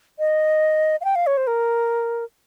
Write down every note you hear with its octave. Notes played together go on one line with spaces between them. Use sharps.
D#5
F5
G5
F5
C#5
C5
A#4